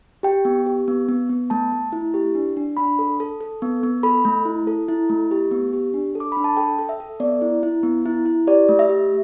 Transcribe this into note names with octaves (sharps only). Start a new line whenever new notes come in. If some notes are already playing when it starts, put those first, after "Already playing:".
G4 G5
B3
G4
B3
B3
B3
A3 A5
A3
E4
G4
D4
D4
D4 B5
A4
A4
A4
B3
B3
A4 B5
A3
E4
A4
E4
A3
G4
B3
G4
D4
A4
D6
D4 B5
A5
A4 G5
A4
E5
A4
B3 D5
E4
E4
B3
E4
E4
G4 D5
A3
E5
G4